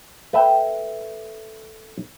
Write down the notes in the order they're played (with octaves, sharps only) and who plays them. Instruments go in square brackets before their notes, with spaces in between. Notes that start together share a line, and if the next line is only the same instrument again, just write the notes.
[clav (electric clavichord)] A3 B4 E5 G5